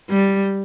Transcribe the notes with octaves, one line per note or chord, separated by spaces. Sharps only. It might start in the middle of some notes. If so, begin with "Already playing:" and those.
G3